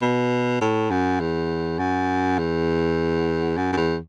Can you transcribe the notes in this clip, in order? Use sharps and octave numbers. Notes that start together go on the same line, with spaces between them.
B2
A2
F#2
E2
F#2
E2
F#2
F#2
E2